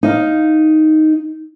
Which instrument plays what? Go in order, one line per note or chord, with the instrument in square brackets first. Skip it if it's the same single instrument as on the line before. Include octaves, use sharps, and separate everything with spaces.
[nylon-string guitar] D#4 F5